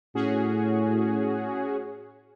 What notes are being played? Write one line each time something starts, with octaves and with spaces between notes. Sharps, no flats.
A2 C#4 F#4 G#4